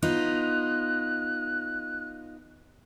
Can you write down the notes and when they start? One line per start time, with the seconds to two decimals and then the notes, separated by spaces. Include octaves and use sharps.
0.02 B3 D#4 F4 F#6